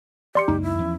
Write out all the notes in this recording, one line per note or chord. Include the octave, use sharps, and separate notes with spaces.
G4 D5 C6 C#7
C#2 F#2 A#3 D#4
E4
E2 F3 C#4